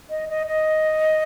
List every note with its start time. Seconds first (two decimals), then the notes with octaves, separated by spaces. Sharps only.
0.10 D#5
0.29 D#5
0.47 D#5